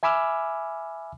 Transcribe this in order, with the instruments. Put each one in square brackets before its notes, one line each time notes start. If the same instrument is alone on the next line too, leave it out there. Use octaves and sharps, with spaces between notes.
[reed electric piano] E5 G#5 B5 D6 E6 F6